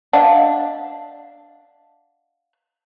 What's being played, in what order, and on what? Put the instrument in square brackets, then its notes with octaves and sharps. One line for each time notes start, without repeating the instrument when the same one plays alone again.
[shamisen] D4 [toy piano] D#5 F5 F#5